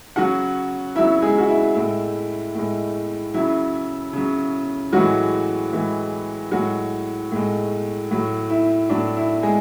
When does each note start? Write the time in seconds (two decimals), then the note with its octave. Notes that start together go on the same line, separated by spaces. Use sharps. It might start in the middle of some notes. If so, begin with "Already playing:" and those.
0.16 C#3 F#3 F#4 F#5
0.96 C#3 F#3 E4 E5
1.22 G#3 G#4
1.38 F#4
1.48 E4
1.75 A2 G#3
2.55 A2 G#3
3.34 C#3 F#3 E4
4.13 C#3 F#3
4.93 A2 E3 F#3 G#3 F#4
5.73 A2 E3 G#3
6.51 A2 F#3 G#3 F#4
7.32 A2 G#3
8.11 A2 F#3
8.50 E4
8.89 A2 F#3 D4
9.17 E4
9.42 G#3 G#4